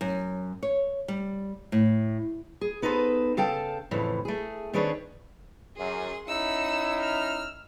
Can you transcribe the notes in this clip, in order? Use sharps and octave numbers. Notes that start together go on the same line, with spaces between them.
F#2
C#5
G3
A2
G#4
B3 D#4 A4 B4 C5
C#3 A4 F5 G5 A5
F2 A2 C#3 E3
A3 G#4
D#3 C4 D4 G#4 B4 C#5
F#2 G#4 C6
C#4 D#4 E4 F#5 E6
E6 F6